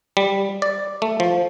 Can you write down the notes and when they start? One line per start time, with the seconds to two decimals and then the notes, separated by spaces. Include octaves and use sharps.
0.17 G3
0.62 D5
1.02 A3
1.20 F3